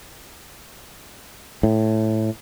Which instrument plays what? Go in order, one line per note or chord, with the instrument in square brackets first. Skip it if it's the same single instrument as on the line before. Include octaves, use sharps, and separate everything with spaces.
[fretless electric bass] A2